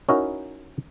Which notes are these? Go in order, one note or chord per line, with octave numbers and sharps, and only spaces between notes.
C#4 D#4 E4 F#4 A#4